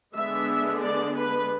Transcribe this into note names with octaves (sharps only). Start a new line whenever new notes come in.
D3 G#3 B3 D4 E5
D5
B4